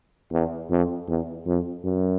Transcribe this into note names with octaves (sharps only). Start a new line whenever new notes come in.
E2
F2
E2
F2
F#2